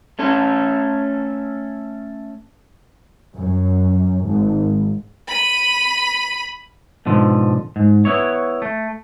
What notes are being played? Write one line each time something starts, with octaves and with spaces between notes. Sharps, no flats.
A3 C#4 A4
F#2
G#1
B5 D#7
G#2 B2 D3 F3
G#2
B3 E4 C#5
A3